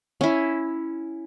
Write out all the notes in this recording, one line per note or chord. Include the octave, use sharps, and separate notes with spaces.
C#4 E4